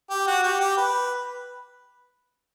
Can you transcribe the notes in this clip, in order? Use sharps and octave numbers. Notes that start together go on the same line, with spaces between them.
G4
F#4
G4
G4
B4